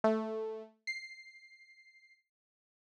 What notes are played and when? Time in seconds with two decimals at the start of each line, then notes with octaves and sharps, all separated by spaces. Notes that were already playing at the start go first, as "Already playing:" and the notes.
0.04 A3
0.87 C7